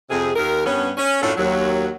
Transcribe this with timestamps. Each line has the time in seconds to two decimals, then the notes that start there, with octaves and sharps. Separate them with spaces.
0.10 F2 C3 G#4
0.36 D#2 A#4
0.66 G2 B3 C#4
0.98 C#4
1.22 F#2 A2 D4 F4 A4 C#5
1.37 D#2 F#3